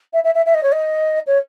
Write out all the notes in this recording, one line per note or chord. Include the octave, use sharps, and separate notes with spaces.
E5
E5
E5
E5
D#5
C#5
D#5
C#5